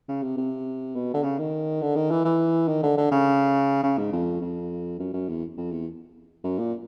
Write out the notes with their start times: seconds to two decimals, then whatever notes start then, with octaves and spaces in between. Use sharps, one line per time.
0.08 C#3
0.22 C3
0.37 C3
0.95 B2
1.14 D3
1.23 C#3
1.38 D#3
1.82 D3
1.96 D#3
2.11 E3
2.25 E3
2.68 D#3
2.83 D3
2.97 D3
3.11 C#3
3.83 C#3
3.98 G#2
4.12 F2
4.41 F2
4.99 F#2
5.13 F#2
5.29 E2
5.57 F2
5.72 E2
6.44 F#2
6.58 A#2